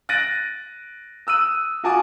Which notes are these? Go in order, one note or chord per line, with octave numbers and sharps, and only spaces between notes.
F#6 A6 A#6 D7 D#7 F#7
D#6 E6 F#6 D#7
F4 F#4 G#5 A5 D6 D#6